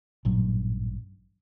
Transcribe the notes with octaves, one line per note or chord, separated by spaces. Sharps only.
A1 G2 A#2 F#3